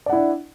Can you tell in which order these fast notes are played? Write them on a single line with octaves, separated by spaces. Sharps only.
D5 F#5 E4 D4